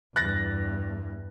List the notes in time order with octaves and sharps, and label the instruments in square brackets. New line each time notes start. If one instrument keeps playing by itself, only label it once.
[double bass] E2 G2 [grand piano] F#6 A6 A#6